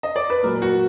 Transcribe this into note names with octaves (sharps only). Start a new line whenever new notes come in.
D#5
D5
B4
A#2 F#3 A#4
F#4